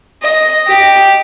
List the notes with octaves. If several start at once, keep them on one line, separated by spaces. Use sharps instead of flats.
D#5
G4